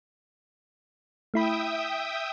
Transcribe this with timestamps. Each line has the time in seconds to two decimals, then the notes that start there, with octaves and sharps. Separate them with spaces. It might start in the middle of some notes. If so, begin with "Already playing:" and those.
1.34 A3 E4 E5 G5 B5 D#6